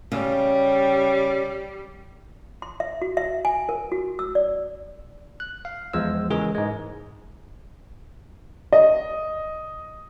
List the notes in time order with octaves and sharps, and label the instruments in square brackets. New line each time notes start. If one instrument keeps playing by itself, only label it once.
[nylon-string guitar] C#3 [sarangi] G3
[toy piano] C6
E5
F#4
E5
G#5
A#4
F#4
E6
D5
[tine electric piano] F#6
F5
E2 F3 G#3 C5 E6
C#3 E3 G#3 G#4 A#4
G#2 G#3
[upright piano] D#5